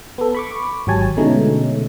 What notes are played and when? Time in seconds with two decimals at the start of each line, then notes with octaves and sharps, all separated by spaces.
0.18 B3 A4
0.35 B5 C#6 D6
0.87 G#1 F#3 G4 C#5 G#5 A5
1.17 B2 D3 G#3 A3 C#4 D#4